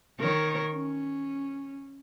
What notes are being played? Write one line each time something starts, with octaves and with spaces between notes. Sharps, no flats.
D#3 A#4 C#5
C#4